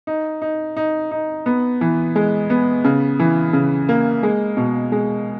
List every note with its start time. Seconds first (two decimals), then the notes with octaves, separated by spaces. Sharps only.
0.07 D#4
0.42 D#4
0.77 D#4
1.11 D#4
1.46 B3
1.81 E3
2.16 G#3
2.50 B3
2.84 C#3
3.19 E3
3.53 C#3
3.89 A#3
4.23 G#3
4.57 B2
4.92 G#3